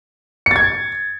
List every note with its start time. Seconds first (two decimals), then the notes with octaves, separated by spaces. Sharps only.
0.46 C#7
0.51 A6
0.56 G#6